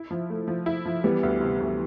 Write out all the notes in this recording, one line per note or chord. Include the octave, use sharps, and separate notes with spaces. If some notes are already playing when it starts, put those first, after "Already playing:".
Already playing: E4
F3
A3
F3
E4
F3
E3 G3 B3
D2
C3
D2